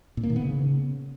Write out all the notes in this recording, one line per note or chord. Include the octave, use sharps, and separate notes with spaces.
A#2
A#3
D#3
B3
C#3